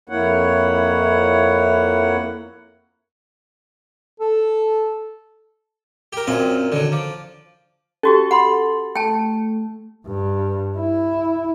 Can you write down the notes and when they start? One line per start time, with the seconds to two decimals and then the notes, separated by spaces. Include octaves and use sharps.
0.09 F2 A#3 E4 C#5 F#5
4.20 A4
6.13 G4 A#4
6.27 F#2 A#2 C4 F5
6.72 D3 D#3 F#3
6.92 F3 D6
8.03 C#4 F#4 G4 A4
8.31 F#5 B5 C6
8.96 A3 G5 A5
10.07 G2
10.78 E4